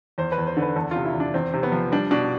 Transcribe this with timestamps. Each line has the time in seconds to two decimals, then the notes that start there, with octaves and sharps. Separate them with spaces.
0.18 E2 C5
0.32 B4
0.38 E2
0.47 C5
0.57 D3
0.62 B4
0.76 E2 A4
0.91 C3 F4
1.05 E4
1.14 E2
1.20 D4
1.34 E2 C4
1.54 C3
1.63 B3
1.72 F3
1.92 G3 D4
2.11 B2 D4